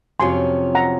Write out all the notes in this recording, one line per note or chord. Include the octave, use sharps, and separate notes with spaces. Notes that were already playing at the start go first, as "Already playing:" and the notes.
F2 C3 F#3 C#4 F4 G#5 C6
F#5 A#5